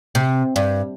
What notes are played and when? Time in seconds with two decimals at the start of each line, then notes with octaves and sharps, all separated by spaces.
0.15 C3
0.56 G2